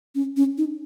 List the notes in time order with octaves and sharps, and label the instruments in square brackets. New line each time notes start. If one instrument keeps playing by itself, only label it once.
[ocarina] C#4
C#4
D#4